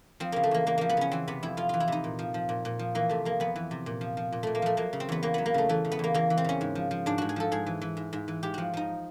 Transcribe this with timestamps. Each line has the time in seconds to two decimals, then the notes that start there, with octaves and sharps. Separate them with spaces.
0.20 F3 C4
0.32 C#3 A#3
0.43 A3
0.51 E2 A#3
0.66 E2 A#3
0.78 F3 A#3
0.89 B3
0.97 C#3 C#4
1.12 E3 C4
1.27 C3 B3
1.43 F2 E4
1.57 F2 F4
1.69 E3 F4
1.80 E4
1.88 C3 D#4
2.04 A#2
2.19 F3
2.34 F3
2.49 A#2
2.65 A#2
2.79 F3
2.95 E3 A#3
3.09 C3 A3
3.25 F2 A#3
3.40 F2 B3
3.56 E3
3.71 C3
3.86 A#2
4.01 F3
4.17 F3
4.32 A#2
4.43 A#2 A3
4.55 A#3
4.62 F3 A3
4.77 F#3 A#3
4.93 C#3
5.00 C4
5.09 E2 B3
5.23 E2 A#3
5.34 F#3 B3
5.46 A#3
5.54 C#3 A3
5.69 E3 A3
5.85 C#3
5.92 B3
5.99 E2 A#3
6.14 E2 A#3
6.30 E3
6.38 C4
6.44 C#3 C#4
6.61 G#2
6.75 F3
6.91 F3
7.06 G#2 D4
7.18 G#2 F#4
7.29 G#4
7.36 F3 A4
7.52 G#2 G#4
7.66 E3
7.81 E3
7.97 G#2
8.13 G#2
8.28 E3
8.43 G#2 G4
8.54 F3 F#4
8.74 F3 D#4